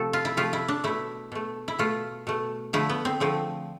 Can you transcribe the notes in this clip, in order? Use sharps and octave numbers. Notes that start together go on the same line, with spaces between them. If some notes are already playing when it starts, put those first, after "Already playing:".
Already playing: C3 F3 A3 A4
F4
E4
C3 F3 A3 F4
E4
D4
B2 A3 E4
B2 A3
E4
B2 A3 F4
B2 A3
D3 F3 A3 E4
B3
C4
D3 F3 A3 C4